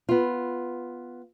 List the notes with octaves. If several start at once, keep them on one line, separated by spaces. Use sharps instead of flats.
B3 F4